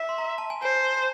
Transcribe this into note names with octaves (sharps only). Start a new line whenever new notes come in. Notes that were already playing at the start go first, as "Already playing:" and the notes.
Already playing: E5
C6
A#5
A5
G#5
C5 G#5